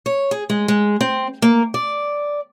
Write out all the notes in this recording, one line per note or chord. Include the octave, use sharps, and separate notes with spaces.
C#5
G#4
G#3
G#3
C4
A#3
D5